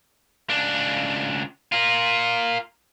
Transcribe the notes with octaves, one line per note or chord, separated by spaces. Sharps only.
C#2 D4
F4 A#4